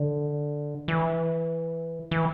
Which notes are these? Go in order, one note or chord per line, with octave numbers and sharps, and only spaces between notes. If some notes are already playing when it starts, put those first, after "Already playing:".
Already playing: D3
E3
E3